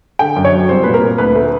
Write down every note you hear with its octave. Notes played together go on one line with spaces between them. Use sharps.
D3 G5
F#2
C#5
F#3
C2 C5
A#2 B4
A#4
A#2
D2 B4
A3